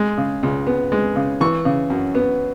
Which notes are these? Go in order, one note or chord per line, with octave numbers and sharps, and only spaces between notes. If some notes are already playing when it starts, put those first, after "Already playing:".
Already playing: G#3
C#3
C#2
B3
G#3
C#3
E3 C#6
C#3
F#2
B3